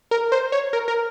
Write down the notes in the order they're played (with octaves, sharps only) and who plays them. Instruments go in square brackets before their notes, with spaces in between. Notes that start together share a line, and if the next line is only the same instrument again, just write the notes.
[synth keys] A#4
C5
C#5
A#4
A#4